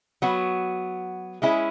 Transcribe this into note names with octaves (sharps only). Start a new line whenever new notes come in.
F#3 B3 F#4
G#3 C#4 E4 G#4